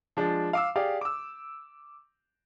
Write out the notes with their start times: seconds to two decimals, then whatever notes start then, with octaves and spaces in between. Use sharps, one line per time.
0.17 F3 G#3 D4
0.53 F5 D6 E6
0.76 G4 G#4 D5 F5
1.01 D6 E6